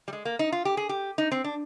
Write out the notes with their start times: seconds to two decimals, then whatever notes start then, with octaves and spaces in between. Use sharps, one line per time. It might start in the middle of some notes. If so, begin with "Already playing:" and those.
0.08 G3
0.13 G#3
0.25 A#3
0.39 D#4
0.52 F4
0.65 G4
0.77 G#4
0.89 G4
1.18 D#4
1.32 C4
1.44 D4